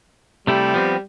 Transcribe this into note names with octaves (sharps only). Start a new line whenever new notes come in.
C3 G3 A3 E4
F3 B3 C4